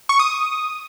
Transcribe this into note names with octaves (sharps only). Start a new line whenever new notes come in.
C#6
D#6